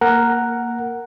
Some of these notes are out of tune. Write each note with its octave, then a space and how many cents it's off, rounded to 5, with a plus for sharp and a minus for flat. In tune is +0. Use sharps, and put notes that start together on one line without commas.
A#3 +0 A#4 +0 F#5 +0